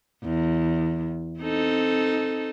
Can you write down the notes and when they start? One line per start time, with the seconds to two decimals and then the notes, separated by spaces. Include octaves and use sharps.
0.24 E2
1.40 C4 D#4 A4